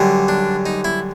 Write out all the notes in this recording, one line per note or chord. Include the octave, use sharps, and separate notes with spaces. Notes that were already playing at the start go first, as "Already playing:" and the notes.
Already playing: F#2 D3 G3
D4
D#4
E4